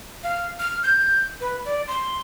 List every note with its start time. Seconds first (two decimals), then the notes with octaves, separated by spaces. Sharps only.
0.23 F5
0.59 F6
0.83 G6
1.41 B4
1.65 D5
1.87 C6